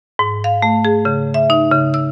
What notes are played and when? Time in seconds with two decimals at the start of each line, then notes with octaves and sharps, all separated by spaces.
0.19 G#2
0.44 F5
0.62 A3
0.85 G#4
1.05 C#3
1.34 E5
1.50 D#4
1.71 C#3
1.94 E6